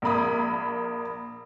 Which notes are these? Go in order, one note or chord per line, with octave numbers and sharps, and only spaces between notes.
A#1 A#3 B5 D#6